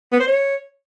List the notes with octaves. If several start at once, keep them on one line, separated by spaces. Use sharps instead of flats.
B3
C5
C#5